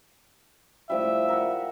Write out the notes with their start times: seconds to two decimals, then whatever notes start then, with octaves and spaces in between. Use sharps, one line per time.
0.90 A2 F3 G3 E5
1.28 A#4 F#5